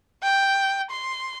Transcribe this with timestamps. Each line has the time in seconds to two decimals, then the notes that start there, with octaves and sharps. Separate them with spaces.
0.23 G5
0.91 C6